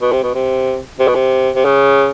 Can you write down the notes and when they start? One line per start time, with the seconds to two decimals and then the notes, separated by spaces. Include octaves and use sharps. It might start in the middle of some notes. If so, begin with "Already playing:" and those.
0.01 B2
0.12 C3
0.23 B2
0.34 C3
1.00 C3
1.08 B2
1.15 C3
1.55 C3
1.65 C#3